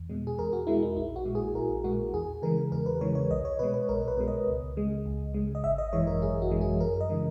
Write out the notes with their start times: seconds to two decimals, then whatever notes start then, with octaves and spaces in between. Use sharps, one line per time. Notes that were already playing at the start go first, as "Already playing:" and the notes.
Already playing: E2
0.10 B2 G#3
0.27 G#4
0.38 E2 A#4
0.53 F#4
0.67 B2 G#3 E4
0.82 D#4
0.97 A#1 E4
1.16 F#4
1.25 A#2 G#3
1.35 G#4
1.54 A#1 A#4
1.84 A#2 G#3 F#4
2.13 E2 G#4
2.42 C#3 E3 G#3 A#4
2.72 E2 A#4
2.86 B4
3.01 C#3 E3 G#3 C#5
3.15 C#5
3.30 B1 D#5
3.45 C#5
3.59 B2 G#3 B4
3.74 B4
3.89 B1 A#4
4.08 B4
4.17 B2 G#3
4.28 D#5
4.47 C#2
4.77 C#3 G#3
5.06 C#2
5.34 C#3 G#3
5.55 D#5
5.64 G#1 E5
5.78 D#5
5.93 F#2 E3 G#3 C#5
6.07 A#4
6.22 G#1 G#4
6.42 F#4
6.51 F#2 E3 G#3
6.61 G#4
6.80 F#2 A#4
7.01 D#5
7.10 C#3 E3 G#3